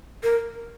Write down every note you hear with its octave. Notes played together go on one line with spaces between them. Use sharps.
A#4